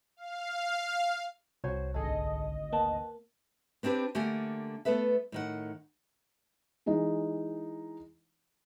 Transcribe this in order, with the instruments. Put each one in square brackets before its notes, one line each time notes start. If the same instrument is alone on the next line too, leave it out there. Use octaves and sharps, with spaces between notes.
[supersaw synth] F5
[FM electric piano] C2 [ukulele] F#4 C5 C#5
[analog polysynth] G#1 D2 D#5 [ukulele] G#4 A4
[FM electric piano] A#3 [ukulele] B4 G5 A5
[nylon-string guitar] B3 C4 D4 G4 B4
D3 A3 A#3 G4 F#5 G#5
A3 B3 A4 B4 E5
A2 D#3 F#5
[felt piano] E3 G#3 D#4